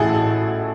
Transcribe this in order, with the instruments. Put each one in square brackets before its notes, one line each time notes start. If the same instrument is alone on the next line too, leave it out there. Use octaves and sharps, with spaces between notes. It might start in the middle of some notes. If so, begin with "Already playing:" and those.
Already playing: [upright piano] A1 A2 E4 F#4 G#4 A4